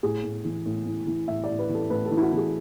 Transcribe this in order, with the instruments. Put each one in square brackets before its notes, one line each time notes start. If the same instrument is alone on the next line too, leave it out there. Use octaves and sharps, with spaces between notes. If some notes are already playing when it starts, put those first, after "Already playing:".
[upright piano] A2 G#4
A2
E3
A2
A2
E3
A2 E5
D5
A2
B4
E3
A4
A2 B4
A4
E3
E4
F#4
E3
G#4